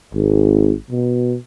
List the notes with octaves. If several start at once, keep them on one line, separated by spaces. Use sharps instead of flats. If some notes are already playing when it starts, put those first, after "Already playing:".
G#1
B2